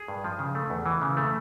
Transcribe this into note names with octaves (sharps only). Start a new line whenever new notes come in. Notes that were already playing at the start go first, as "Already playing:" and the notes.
Already playing: G#4
G2
F3
C#3
A3
E2
E3
C#3
A3